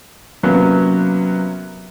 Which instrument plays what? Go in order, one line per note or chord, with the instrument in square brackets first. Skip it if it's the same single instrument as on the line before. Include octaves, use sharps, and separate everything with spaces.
[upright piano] C3 F#3 A#3 B3 C#4